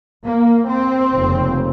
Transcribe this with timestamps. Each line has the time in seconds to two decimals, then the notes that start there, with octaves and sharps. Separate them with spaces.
0.24 A#3
0.68 C4
1.13 F1 D#2 C#3